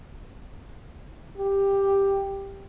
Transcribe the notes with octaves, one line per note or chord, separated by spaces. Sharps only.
G4